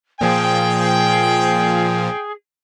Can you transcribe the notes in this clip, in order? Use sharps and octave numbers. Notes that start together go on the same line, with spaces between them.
A#2 F3 G#4 G5